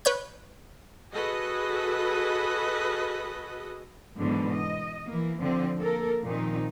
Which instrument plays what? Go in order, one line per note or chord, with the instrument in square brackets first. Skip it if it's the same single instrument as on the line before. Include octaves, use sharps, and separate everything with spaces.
[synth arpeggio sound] B4 C#5 G6
[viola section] F#4 G#4 A4 B4 D#5
[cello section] G#2 B2 D3 E3 F#3
D#5
E3 A#3
D3 F3 C4
A#3 A4 A#4
A#2 D#3 F3 C4 D#4